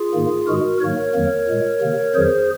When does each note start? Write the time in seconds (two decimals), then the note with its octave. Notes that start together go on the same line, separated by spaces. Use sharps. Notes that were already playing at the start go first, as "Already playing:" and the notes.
Already playing: F4 G#4
0.14 G#2 D#3 A#3
0.47 G#2 D#3 G#3 F#4 A#4
0.81 G#2 D#3 F#3 A#3 A#4 C#5
1.14 F2 D#3 F#3 A#3
1.48 A#2 G#3
1.81 C3 D#3 A#3
2.14 F2 D#3 F#3 G#4 C5